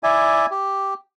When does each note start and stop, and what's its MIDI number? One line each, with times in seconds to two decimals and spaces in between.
0.03 0.46 64
0.03 0.46 74
0.03 0.46 76
0.03 0.46 80
0.51 0.94 67